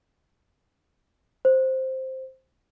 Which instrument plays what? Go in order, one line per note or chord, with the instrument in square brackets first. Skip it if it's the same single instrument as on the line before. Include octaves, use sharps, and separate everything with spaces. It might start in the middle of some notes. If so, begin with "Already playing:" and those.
[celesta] C5